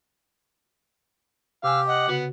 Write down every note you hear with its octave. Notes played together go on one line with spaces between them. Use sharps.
C3 G4 F5 G#5 E6
D#5 F#5
C#3 B3 F#4